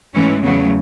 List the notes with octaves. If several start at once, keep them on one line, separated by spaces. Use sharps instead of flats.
G#2 E3 A3 C#4
E2 C#3 F#3 A3 B3